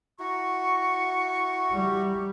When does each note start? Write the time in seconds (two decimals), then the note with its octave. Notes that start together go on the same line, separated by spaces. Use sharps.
0.19 E4 F#4 A#5 C#6
1.72 G3